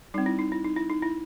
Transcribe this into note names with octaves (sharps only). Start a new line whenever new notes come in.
G3 C4 D#4
E4
D#4
E4
D#4
E4
D#4
E4